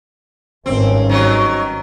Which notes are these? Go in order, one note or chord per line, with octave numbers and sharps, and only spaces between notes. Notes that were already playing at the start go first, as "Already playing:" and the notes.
G#1 G2 C4 C#4
D#3 F#3